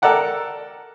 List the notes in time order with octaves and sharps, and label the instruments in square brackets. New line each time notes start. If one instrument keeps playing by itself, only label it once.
[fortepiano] A4 A#4 D5 F#5 G5